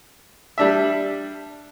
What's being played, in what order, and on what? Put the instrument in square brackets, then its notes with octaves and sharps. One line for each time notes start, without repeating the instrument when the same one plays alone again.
[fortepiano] G3 D4 E5